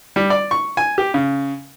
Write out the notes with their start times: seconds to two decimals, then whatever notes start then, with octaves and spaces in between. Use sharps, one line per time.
0.16 G3
0.30 D5
0.51 C#6
0.77 G#5
0.98 G4
1.14 C#3